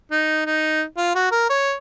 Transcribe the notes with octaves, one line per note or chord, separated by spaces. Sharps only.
D#4
D#4
F4
F#4
A#4
C#5